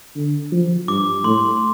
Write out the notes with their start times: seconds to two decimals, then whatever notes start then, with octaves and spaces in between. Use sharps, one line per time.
0.16 D3
0.52 F3
0.88 G2 D6
1.24 A2 C6